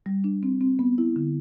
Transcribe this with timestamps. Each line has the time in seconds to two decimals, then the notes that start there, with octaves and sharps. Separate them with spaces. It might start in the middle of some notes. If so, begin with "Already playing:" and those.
0.06 G3
0.24 D4
0.43 C4
0.61 C4
0.79 B3
0.98 E4
1.16 D3